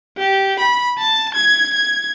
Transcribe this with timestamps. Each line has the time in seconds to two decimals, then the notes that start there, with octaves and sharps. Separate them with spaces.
0.18 G4
0.59 B5
0.99 A5
1.34 G#6
1.73 G#6